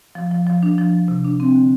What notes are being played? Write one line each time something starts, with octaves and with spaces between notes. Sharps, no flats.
F3
F3
F3
D4
F3
F3
C3
D4
C4
D3